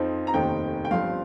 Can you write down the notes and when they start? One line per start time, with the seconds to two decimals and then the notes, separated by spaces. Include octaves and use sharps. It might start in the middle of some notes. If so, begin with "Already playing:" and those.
Already playing: F2 F3 C4 D#4
0.27 A#5
0.34 F1 D#2 D#3 C4 D#4 G5
0.85 G5
0.91 G1 G2 F3 C4 F5